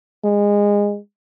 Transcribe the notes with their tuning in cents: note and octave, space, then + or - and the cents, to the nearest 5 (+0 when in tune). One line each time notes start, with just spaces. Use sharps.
G#3 -20